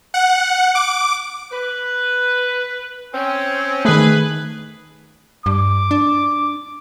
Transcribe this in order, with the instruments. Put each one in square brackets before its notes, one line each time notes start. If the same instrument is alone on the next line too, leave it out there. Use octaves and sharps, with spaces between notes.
[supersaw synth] F#5
D6
[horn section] B4
C4 C#4
[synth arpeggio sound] D#3 A3 [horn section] G#4 B4
[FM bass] G2 [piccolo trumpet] D6
[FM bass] D4